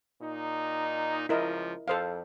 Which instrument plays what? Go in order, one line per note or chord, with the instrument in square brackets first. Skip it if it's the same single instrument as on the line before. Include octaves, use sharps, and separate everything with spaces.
[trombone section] A#2 D#4
[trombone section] C#2 F3 [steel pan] E4 A#4 D#5
[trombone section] F2 [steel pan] A4 C5 F5